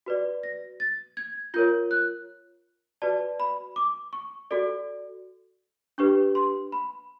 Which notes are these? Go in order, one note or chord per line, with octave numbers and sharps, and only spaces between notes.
F#4 B4 D5
A#6
A6
G#6
F4 A#4 C#5 G6
F#6
F#4 B4 D5 A5
B5
D6
C#6
F#4 A4 D5
D4 G4 B4 C#6
C6
B5